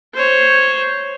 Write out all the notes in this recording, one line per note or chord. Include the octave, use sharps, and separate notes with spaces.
C5 C#5